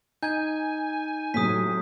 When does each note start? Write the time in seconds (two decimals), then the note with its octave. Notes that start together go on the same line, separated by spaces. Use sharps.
0.23 D#4 G#5 G6 G#6
1.34 A2 C3 F#3 D#6 B6